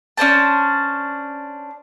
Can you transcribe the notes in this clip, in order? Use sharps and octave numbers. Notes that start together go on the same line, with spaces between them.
C#4 D4 C5 A5